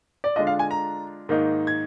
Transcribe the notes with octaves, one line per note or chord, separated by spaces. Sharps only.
D5
D3 G#3 D4 F4 D#5
F5
G#5
A#5
G#2 D#3 A#3 D#4
G#6